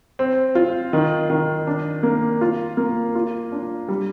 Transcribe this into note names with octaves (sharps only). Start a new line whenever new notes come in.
C4
F4
D#3
D#3
D4
A#3
F4
A#3
F4
D4
G3